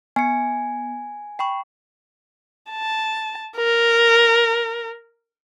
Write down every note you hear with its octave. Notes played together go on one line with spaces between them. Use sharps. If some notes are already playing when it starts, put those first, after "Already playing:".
B3 G#5 C#7
G5 B5 C#6
A5
A#4